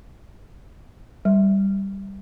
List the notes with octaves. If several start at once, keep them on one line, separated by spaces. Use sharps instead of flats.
G3